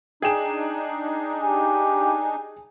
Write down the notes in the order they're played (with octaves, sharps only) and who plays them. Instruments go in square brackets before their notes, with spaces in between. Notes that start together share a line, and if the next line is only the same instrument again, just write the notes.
[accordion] D4 D#4 [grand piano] G#4 G5 E7
[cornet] G4 [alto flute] G#5